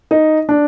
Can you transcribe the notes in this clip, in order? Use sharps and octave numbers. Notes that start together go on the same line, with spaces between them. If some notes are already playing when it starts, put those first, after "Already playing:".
D#4
D4